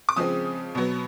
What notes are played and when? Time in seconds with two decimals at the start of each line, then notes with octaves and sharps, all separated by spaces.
0.09 D6
0.16 C#3 F3 G#3 C4 D#6
0.75 B2 F#3 B3